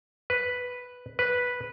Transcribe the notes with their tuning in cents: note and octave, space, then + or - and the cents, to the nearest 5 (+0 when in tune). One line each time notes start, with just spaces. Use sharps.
B4 +0
B4 -5